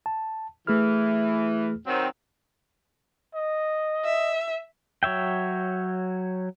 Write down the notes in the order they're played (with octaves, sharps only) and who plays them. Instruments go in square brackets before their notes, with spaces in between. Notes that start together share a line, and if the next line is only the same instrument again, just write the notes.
[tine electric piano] A5
[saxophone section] E3 [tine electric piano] A3 G#4 F6
[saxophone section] D#3 F#3 C4
[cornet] D#5
[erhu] E5
[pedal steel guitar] F#3 C#5 E5 G5